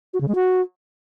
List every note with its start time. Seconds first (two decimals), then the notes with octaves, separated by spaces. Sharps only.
0.14 F#4
0.21 C#3
0.28 G#3
0.35 F#4